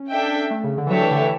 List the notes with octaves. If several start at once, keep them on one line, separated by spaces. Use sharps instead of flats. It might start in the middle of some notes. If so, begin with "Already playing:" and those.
Already playing: C#4
D4 A4 E5 G5
A3
C#3
D3
E3
F#3 A3 D4 G4 C#5 E5
E3
D3
E3